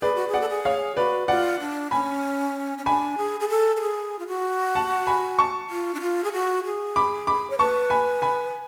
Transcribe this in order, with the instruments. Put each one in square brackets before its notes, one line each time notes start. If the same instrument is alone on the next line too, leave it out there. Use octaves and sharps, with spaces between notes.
[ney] G#4 [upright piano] B4 D5
[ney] F#4
G#4
[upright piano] D5 F#5
[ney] A4
G#4
[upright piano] C#5 F5
[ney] F#4 [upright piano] B4 D5
[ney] F4 [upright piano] D5 F#5
[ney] D4
[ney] C#4 [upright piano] G#5 B5
[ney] C#4
[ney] D4 [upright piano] G#5 B5
[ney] G#4
G#4
A4
A4
G#4
F4
F#4
[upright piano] F#5 A5
G#5 B5
A5 C#6
[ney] F4
D4
F4
G#4
F#4
G#4
[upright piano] B5 D6
B5 D6
[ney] C#5
[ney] B4 [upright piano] A5 C#6
[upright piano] G#5 B5
G#5 B5